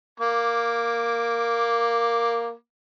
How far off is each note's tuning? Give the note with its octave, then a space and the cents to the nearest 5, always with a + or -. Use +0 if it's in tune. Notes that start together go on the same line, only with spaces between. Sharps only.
A#3 +0 D6 +0